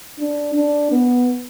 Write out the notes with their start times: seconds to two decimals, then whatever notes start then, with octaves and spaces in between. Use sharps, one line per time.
0.19 D4
0.55 D4
0.92 B3